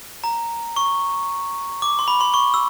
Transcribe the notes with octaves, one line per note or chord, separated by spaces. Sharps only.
A#5
C#6
D6
C6
B5
C6
C#6
E6